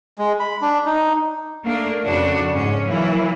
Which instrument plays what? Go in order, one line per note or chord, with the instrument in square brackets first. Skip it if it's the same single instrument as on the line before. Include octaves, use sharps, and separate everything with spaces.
[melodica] G#3
B5
D4
D#4
[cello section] A3 A#3 D4 A#4
F2 C#3 D4 F#4
G#2 G#3 C#4
E3 F#3 A#3 E4